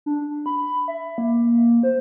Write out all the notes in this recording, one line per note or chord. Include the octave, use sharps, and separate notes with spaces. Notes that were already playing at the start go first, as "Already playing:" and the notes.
D4
B5
E5
A#3
C5